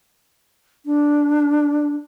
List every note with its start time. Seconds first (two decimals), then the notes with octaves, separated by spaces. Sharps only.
0.86 D4